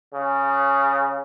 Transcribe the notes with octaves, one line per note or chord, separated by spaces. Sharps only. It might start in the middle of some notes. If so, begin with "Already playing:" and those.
C#3